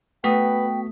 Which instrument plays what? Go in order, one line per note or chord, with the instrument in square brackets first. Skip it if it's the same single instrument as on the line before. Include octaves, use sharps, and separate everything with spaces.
[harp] A3 D#6 [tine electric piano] B3 F#4 B6 [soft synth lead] B4 [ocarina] G5